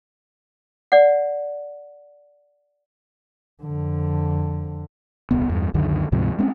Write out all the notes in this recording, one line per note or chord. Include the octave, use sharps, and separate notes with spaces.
D5 F#5
F2 D3
D#1 C2 B3
E2 G2
C#2 F#2 D3 D#3
D2 G#2 C3 F3
G#3 C4 C#4